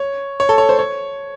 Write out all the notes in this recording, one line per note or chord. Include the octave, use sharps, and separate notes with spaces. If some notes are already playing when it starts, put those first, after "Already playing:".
Already playing: C#5
C#5
A4
C#5
C5
C#5